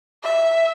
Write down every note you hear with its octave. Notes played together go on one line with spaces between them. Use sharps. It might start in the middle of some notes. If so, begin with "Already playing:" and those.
E5